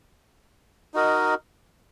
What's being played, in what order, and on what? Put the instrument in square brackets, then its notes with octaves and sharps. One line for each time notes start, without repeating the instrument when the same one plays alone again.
[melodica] D#4 F#4 A#4 D#5